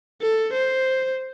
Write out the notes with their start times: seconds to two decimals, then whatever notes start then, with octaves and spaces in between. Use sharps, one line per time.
0.22 A4
0.53 C5